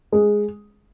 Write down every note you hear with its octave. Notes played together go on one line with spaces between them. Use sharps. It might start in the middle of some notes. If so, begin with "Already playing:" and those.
G#3